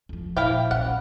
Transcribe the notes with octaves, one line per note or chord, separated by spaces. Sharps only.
F2 F3
A#2 E4 F5 G5
B1 C#4 F#5